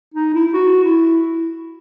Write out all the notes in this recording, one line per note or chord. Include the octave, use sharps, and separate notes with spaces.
D#4
E4
E4
F#4
E4